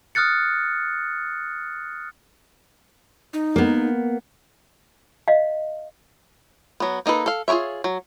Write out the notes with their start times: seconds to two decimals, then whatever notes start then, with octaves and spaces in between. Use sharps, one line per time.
0.15 D#6 F6 F#6 A6 C#7
3.33 D#4
3.56 A#3 B3
5.28 D#5 F5
6.80 F#3 B3
7.06 A#3 D#4 A4 B4
7.26 A4 F5
7.48 F4 G#4 A#4 C#5 E5
7.84 F#3